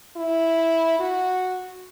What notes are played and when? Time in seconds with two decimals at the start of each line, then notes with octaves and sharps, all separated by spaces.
0.16 E4
0.99 F#4